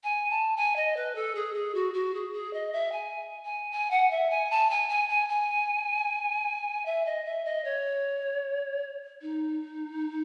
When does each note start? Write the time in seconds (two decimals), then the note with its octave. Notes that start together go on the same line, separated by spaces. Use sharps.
0.03 G#5
0.30 A5
0.56 G#5
0.76 D#5
0.96 B4
1.15 A4
1.35 G#4
1.54 G#4
1.74 F#4
1.93 F#4
2.14 G#4
2.33 G#4
2.53 D#5
2.72 E5
2.92 G#5
3.44 G#5
3.71 G#5
3.90 F#5
4.10 E5
4.30 G#5
4.50 A5
4.70 G#5
4.89 G#5
5.09 G#5
5.28 G#5
6.85 E5
7.05 D#5
7.24 E5
7.44 D#5
7.64 C#5
9.22 D#4